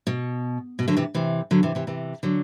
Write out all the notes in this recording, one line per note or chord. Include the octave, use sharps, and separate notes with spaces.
B2
B2
D3 F#3
C3 E3
C3 E3
D3 F#3
C3 E3
C3 E3
C3 E3
D3 F#3